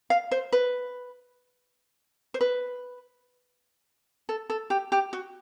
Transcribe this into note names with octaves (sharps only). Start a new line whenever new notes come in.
F5
C5
B4
C5
B4
A4
A4
G4
G4
F#4